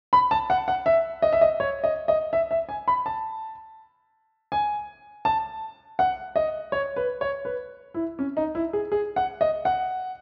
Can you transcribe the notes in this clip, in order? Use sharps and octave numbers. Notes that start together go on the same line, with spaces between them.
B5
A5
F#5
F#5
E5
D#5
E5
D#5
C#5
D#5
D#5
E5
E5
G#5
B5
A5
G#5
A5
F#5
D#5
C#5
B4
C#5
B4
E4
C#4
D#4
E4
G#4
G#4
F#5
D#5
F#5